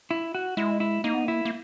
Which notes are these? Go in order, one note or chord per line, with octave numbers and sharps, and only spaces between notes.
E4
F#4
G#3 E4
E4
A#3 D#4
B3
A#3 E4
A#3